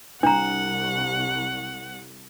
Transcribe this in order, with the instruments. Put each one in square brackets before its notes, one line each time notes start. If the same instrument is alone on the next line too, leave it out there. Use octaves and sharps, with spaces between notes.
[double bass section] C2 [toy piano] D4 A#5 [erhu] F#5